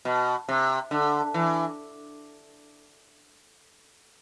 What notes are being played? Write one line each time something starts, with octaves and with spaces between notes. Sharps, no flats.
B2
C3
D3
E3